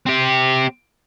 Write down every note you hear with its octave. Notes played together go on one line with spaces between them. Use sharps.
C4 G4